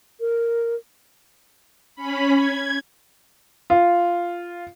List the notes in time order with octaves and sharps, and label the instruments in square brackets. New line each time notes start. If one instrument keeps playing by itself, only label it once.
[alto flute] A#4
[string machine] C#4 B5
G#6
[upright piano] F4